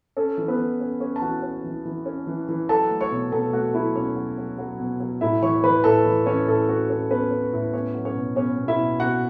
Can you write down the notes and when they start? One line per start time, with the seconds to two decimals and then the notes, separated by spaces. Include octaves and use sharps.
0.17 C#4 A4
0.38 E3
0.48 B3 B4
0.58 E3
0.81 C#4
1.00 C#4 C#5
1.16 A5
1.22 E3 F#4 F#5
1.42 C#4
1.64 E3
1.85 E3
2.06 C#4
2.27 E3
2.49 E3
2.69 F#3 A4 A5
2.91 A3
3.01 C#5 C#6
3.11 B2
3.32 B2 A4 A5
3.53 A3 F#4 F#5
3.74 F#3 E4 E5
3.96 B2 C#4 C#5
4.16 F#3
4.38 F#3
4.58 F#3
4.80 B2
5.00 F#3
5.21 A2 E4 E5
5.42 E3 C#5 C#6
5.63 E3 B4 B5
5.84 A2 A4 A5
6.06 E3
6.26 E3 C#4 C#5
6.48 A2 A4
6.69 C#4 F#4
6.90 C#4 A4
7.10 B3 C#4 B4
7.31 C#4
7.53 A2
7.73 B3 C#4 C#5
7.94 F#3
8.05 C#4 C#5
8.15 B2
8.36 B3 C#4 C#5
8.58 B2
8.68 E4 E5
8.79 B2
9.00 B2 F#4 F#5